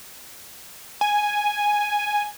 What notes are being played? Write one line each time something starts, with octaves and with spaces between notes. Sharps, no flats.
G#5